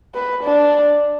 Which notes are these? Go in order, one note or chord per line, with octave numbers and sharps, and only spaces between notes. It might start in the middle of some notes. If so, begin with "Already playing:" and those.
B4
D4